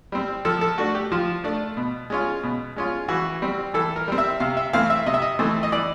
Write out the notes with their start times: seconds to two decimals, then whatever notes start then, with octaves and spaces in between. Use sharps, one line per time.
0.12 G3 C4
0.45 F3 A4
0.61 A4
0.78 A3 D4 F#4
0.95 G4
1.12 F3 F4
1.44 A3 D4
1.77 B2
2.10 G#3 C#4 F4
2.43 B2
2.76 G#3 C#4 F4
3.08 E3 F#4
3.42 G3 C4
3.74 E3 A4
3.96 A#4
4.08 G3 C4
4.18 E5
4.40 C3 F5
4.57 E5
4.73 E3 A3 C4 F5
4.90 E5
5.06 C3 D#5
5.14 E5
5.22 D#5
5.39 E3 A3 C4
5.63 D#5
5.72 E3 D5